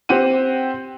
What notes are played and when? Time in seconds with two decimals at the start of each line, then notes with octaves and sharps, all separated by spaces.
0.09 C4 G4 C5 F#5 D#7